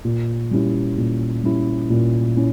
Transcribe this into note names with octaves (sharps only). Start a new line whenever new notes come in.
A#2
G3 C#4 E4
A#2
G3 C#4 E4
A#2
C#4 E4